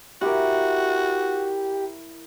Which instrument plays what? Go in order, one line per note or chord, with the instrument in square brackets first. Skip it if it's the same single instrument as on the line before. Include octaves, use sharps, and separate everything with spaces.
[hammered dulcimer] E4 A#4 [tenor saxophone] F#4 [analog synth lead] G4